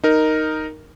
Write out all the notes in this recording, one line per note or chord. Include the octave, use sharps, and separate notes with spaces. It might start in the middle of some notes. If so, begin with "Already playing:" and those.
D#4 A#4